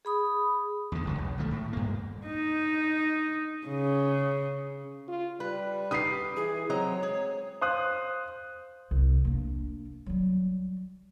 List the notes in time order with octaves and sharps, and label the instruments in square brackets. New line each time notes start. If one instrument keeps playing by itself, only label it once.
[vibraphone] G#4 B5 D#6
[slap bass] E2 D3
G1 C#2 D3
B1
C#2 D#3 A3
A2
G2 A#3
[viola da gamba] D#4
C#3
[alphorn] F4
[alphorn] G3 [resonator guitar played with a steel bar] B4
[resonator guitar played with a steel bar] D#4 G4 B4 [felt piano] D#6 C7
[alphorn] E3 [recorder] G#4
[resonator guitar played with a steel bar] F#3 D#5 A#5 [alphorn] C4 [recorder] C#5
[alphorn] G#3 [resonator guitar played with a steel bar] G#4
[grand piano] C5 F5 D#6 F#6
[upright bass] C2
A#3 D4
F#3 G3